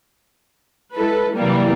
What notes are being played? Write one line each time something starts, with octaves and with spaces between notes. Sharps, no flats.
G#3 E4 A4 B4
C3 E3 F#3 G3 A#3